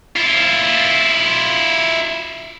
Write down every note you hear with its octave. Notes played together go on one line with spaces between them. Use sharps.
E4 F4